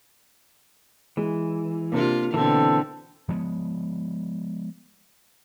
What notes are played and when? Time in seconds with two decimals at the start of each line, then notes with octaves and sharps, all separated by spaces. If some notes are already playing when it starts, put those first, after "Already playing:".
1.17 E3 G#3
1.92 C3 A#3 D4 F4 A#4
2.34 B2 D3 E3 C4 A4
3.29 F3 G#3 B3